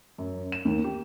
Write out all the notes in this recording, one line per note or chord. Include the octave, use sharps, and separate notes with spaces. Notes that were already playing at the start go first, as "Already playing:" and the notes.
F#2
E7
D#2
G4